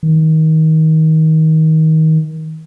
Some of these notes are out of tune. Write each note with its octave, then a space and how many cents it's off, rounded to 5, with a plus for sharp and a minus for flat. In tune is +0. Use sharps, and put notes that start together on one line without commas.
D#3 +25